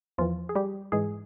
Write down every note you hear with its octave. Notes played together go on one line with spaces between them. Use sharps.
E2 E3 F3 F4
G#4
G3 G4
G#2 E3 G#3 G#4